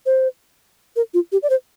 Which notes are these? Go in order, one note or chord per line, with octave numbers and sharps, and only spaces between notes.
C5
A#4
F4
G4
D5
C5